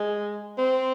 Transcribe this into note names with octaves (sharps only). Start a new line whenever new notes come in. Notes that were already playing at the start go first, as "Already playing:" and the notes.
Already playing: G#3
C4